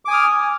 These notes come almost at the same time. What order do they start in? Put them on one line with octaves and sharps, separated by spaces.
D6 G#5 D#6 F6